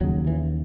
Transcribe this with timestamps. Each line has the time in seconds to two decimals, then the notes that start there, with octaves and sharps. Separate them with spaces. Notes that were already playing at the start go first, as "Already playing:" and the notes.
0.01 D#2 F#3
0.04 C#3
0.27 E3